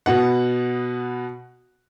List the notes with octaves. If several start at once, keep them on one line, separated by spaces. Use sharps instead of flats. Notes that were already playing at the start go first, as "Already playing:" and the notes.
B2 B3 F#5